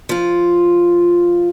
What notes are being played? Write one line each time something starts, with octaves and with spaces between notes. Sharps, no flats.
F3 F4